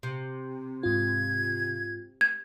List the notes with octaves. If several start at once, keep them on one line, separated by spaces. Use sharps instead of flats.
C3
G#2 F4 G#6
G#6